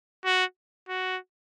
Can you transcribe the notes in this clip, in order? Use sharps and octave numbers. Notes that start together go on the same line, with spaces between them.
F#4
F#4